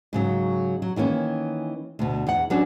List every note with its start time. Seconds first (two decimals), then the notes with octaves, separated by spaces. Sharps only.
0.13 G#2 C#3 F#3
0.82 F#3
0.96 D#3 E3 A#3 C#4
1.99 D2 B2
2.27 E2 F#5
2.50 F#3 B3 C#4 D4 F#4